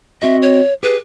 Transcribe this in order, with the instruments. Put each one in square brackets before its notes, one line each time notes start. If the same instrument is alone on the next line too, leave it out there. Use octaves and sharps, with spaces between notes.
[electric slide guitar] C4 F#4 D#5 [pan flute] E5
[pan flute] C#5
[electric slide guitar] G4 G#4 [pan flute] B4